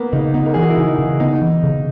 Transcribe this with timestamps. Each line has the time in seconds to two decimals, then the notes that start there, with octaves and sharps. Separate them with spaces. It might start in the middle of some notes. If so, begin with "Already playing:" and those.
Already playing: A#3 B3
0.13 C#3 D#4
0.34 B3 D#4
0.46 A#4
0.54 E3 G#4
0.62 F#4
0.69 E4
0.77 C#3 D#4
0.99 C#3
1.20 B3 D#4
1.42 E3
1.63 C#3